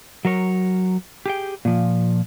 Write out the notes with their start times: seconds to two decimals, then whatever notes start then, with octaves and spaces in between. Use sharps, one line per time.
0.25 F#3 A#4 C#5
1.26 G4 G#4 G5
1.65 A#2 F3